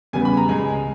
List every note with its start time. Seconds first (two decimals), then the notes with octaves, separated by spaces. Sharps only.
0.13 E2 C#3 G3 B3 G#5
0.25 B5
0.37 A#5
0.49 C#2 C#3 G#3 G#5